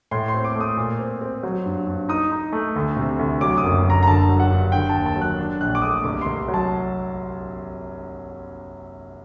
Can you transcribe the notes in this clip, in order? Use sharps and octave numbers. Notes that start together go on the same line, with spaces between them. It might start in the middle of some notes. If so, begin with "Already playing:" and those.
A2 C6
C6
C4
D6
A3
D#6
A#2
C4
C4
F#3
G2
G2
D#4 D#6
D#4
A3
D2
C3
D2
F#3 D6
D#6
F#1
F#1 A#5
A#5
D3 A5
F#3
F#5
G2
D3 G5
A5
D#2
A5
F#3
F#6
D4
A#1 F#6
D6
A3 D#6
C2 D6
C6
C2
F#3
A5